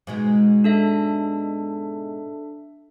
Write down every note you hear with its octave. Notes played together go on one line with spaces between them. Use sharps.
G#2 B2 G#3
D4 A4 E5